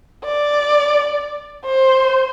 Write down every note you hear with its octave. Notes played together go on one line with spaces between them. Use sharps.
D5
C5